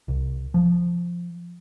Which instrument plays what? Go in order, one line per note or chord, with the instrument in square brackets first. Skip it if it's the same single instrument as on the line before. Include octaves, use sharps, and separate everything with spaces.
[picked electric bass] C2
F3